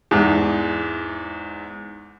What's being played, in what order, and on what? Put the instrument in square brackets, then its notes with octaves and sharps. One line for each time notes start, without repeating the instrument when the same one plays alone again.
[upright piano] E2 G#2